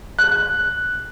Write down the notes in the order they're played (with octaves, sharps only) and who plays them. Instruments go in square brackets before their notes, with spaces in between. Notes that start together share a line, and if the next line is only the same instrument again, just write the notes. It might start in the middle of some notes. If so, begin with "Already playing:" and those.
[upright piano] F#6